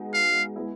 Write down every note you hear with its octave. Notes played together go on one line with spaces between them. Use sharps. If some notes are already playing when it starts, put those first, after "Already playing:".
Already playing: G#3 B3 D#4 F#4
F5
G#3 B3 E4